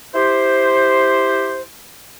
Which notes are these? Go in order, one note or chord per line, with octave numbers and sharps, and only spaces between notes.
E4 G4 C5